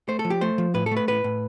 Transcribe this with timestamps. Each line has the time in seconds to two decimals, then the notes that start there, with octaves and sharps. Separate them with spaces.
0.08 A3 C5
0.19 A4
0.25 F3
0.30 G4
0.41 A3 C5
0.58 F3
0.74 A2 B4
0.86 A4
0.92 A3
0.97 B4
1.08 A2 B4
1.24 A2